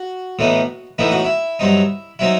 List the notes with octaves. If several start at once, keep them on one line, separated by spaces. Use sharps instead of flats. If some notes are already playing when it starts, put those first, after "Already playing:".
Already playing: F#4
A2 E3 B3 D#4
A2 E3 B3 D#4 E4
F#4
E4
G2 F#3 C4 D#4
F#3 C4 D#4 E4